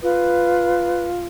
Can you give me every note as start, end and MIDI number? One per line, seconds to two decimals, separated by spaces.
0.03 1.26 65
0.03 1.05 71